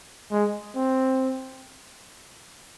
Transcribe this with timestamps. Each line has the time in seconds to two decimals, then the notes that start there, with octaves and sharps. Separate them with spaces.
0.31 G#3
0.76 C4